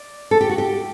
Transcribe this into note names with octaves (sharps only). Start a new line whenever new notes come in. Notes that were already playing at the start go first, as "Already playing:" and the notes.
Already playing: D5
A4
G4
F#4
G4